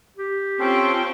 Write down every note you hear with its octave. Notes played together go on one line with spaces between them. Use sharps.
G4
C4 C#4 F4 A4 C5 G5